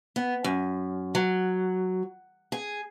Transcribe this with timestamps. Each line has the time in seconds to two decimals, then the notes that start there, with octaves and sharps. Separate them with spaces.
0.16 B3
0.44 F#2
1.15 F#3
2.52 G#4